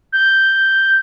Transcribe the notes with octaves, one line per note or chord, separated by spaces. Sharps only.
G6